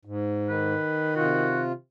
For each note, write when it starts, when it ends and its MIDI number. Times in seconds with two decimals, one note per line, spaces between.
0.05 0.74 44
0.49 1.78 51
0.49 1.16 71
1.16 1.72 48
1.16 1.72 65
1.16 1.61 66